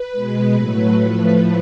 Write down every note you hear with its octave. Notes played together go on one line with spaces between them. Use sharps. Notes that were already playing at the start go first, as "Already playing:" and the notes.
Already playing: B4
B2 G#3
A2 F#3 A3
A2 F3 A3 B4